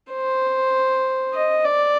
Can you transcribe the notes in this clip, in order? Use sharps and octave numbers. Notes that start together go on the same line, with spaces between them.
C5
D#5
D5